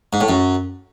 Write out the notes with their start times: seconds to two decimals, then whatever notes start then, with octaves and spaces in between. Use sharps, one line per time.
0.13 G#2
0.21 A2
0.28 F#2